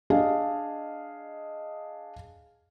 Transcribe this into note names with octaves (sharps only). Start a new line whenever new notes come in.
D4 G#4 D#5 F5